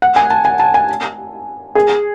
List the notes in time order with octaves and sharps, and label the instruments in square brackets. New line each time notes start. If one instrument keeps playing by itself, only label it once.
[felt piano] F#5
G#5
A5
G#5
A5
G#5
G#4